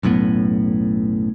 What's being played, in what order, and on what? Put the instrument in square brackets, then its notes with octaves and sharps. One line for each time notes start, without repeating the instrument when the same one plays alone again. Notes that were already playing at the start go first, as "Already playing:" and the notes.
[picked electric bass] B1 F#2 A2 B3